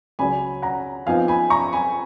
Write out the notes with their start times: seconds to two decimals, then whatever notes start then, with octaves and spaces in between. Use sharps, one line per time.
0.19 C#2 C#3 F#3 C#4 G#5 B5
0.62 F#5 A#5
1.07 F2 F3 B3 D#4 F5 G#5
1.28 G#5 B5
1.50 A#5 C#6
1.72 G#5 B5